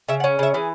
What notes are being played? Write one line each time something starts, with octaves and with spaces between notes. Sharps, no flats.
C#3 E5
F#5
C#4
C#3 E5
E3 G#4